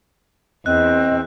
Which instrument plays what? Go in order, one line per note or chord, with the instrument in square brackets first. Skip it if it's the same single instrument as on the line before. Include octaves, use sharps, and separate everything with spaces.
[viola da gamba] E2 [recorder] C4 [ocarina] D#5 [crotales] F#6